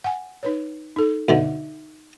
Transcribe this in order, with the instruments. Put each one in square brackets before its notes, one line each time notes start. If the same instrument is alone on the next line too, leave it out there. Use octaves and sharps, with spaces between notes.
[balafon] F#5 G#5
D#4 B4 C#5
D#4 A4
[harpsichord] D2 B2 D3 [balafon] D#4 E5